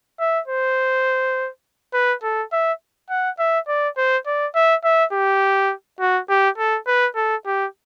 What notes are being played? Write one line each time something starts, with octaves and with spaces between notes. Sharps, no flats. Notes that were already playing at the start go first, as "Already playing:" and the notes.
E5
C5
B4
A4
E5
F#5
E5
D5
C5
D5
E5
E5
G4
F#4
G4
A4
B4
A4
G4